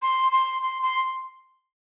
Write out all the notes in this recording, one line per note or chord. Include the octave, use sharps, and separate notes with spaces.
C6
C6
C6
C6